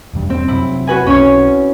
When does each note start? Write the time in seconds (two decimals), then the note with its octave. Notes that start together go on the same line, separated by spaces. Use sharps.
0.13 E1 G2 G3
0.30 C4
0.48 F2 C3 F#3 E4
0.87 F#4 B4 G#5
1.07 B1 C#4 C#5